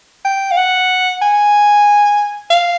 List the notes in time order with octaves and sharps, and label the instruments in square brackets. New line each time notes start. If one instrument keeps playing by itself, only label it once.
[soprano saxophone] G5
F5
F#5
G#5
F5